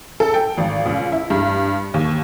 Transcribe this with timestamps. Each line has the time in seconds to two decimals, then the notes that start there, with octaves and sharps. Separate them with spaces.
0.20 A4
0.34 G5
0.57 G#1
0.86 C#2
1.12 E4
1.30 G2
1.94 D#2